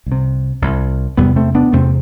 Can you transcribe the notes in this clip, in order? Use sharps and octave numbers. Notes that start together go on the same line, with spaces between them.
C2
C3
C2 C3
E2 C3 G3 B3
A3 C4
B3 D4
E2 C3 A3 C4